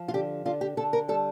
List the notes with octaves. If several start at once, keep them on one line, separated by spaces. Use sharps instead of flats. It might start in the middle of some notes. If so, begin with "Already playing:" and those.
Already playing: F3
F4
D3 G4
D3 F4
G4
D3 A4
A#4
G3 A4